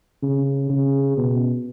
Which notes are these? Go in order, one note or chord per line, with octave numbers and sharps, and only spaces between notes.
C#3
C#3
B2